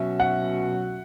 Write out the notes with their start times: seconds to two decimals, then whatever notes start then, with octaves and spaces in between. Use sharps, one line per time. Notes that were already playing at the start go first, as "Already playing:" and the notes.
Already playing: B2 F#3 C#4 F#4 E5
0.20 F#5